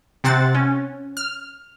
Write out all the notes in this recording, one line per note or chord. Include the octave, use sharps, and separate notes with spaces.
C3 C4 C5 F#5 A6
C#4
F6